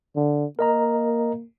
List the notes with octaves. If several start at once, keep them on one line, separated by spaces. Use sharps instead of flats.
D3
A#3 A#4 D#5 A#5